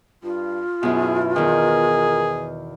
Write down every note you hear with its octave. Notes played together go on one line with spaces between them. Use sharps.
G2 F4
F#2 B2 E4 G#4
E2 D#3 G#4 A#4